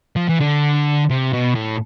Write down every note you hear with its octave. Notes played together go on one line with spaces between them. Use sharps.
F3
E3
D3
C3
B2
A2